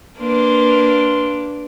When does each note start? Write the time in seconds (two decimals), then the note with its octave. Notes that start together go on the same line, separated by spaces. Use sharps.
0.19 A#3 D4 B4 C6